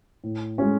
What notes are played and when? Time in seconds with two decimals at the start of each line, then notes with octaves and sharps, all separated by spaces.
0.24 A2
0.58 G#3 C#4